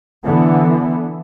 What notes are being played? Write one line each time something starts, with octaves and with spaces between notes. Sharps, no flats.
D3 E3 B3